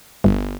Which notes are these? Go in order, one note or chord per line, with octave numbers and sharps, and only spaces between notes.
G1